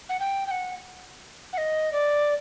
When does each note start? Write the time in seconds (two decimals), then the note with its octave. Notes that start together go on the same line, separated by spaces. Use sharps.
0.09 F#5
0.20 G5
0.47 G5
0.51 F#5
1.53 F#5
1.58 D#5
1.92 D5